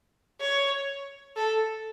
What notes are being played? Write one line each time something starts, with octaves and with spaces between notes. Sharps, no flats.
C#5
A4